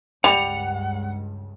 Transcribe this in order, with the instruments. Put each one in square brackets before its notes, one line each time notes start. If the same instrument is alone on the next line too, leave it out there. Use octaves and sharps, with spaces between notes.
[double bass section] C#2 G2 [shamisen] G3 [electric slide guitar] F#5 [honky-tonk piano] F7